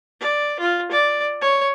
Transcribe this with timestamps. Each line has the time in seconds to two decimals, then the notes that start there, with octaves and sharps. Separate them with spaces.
0.21 D5
0.60 F4
0.92 D5
1.41 C#5